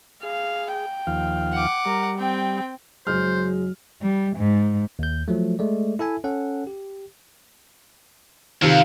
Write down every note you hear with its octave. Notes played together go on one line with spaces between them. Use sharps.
G#4 F5
G5
D#2 F3 F5
F#5 D6
G3 A#4
C4 G5
F#1 F#3 G#3 C5 F6
G3
G#2
D#2 G6
F3 F#3 A3
G#3 A3 D5
E4 A4 E5 G#5
C#4 A4 F#5
G4
F2 C3 D#3 F3